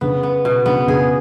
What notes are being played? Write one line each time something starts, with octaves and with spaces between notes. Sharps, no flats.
C#3 B3
B3
B2
C#3 B3
C#3 G#4